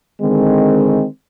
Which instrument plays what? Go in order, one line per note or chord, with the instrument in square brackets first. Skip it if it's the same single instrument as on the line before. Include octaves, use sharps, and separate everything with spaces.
[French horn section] D3 D#3 G#3 C4